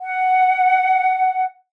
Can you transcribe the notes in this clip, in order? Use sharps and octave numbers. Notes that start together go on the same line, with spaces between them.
F#5